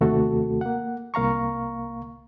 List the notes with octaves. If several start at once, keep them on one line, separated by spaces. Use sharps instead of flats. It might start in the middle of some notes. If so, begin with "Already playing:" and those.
D#2 C3 A3 F#4 A4
A#3 F#5
C2 A#3 F5 A#5 C#6